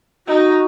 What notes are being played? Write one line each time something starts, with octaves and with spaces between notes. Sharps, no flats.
D#4 F#4